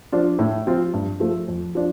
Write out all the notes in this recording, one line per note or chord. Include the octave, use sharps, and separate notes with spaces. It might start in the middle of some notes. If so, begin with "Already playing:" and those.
F3 D4 F4
A2
F3 C4 F4
G2
F3 A3
F2
F3 D4